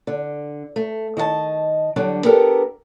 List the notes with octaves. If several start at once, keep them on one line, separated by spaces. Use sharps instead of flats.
D3
A3
D#3 D#5 F5 A5
D3 F#3 G3 D4
B3 D4 G4 A4 A#4